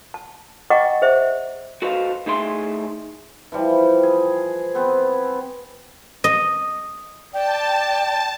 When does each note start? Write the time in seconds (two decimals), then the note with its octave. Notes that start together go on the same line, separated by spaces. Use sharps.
0.14 A5
0.70 D#5 F#5 G5 A#5 C#6 D6
1.02 G#4 C5 E5
1.82 F#4 A4 B4 C5 D#5 F5
2.26 A2 D#4 G#4 E5 C6
3.52 E3 F3 G3
4.03 G#4
4.75 B3 C4 G#4
6.24 D#5
7.34 D5 G5 A5